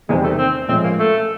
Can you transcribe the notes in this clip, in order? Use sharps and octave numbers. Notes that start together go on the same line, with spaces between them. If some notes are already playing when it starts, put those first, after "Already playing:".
E2 C3 D#3 G3 G#3 C4
A3
C4
A2 F3 G#3 C4 C#4
A#3
A3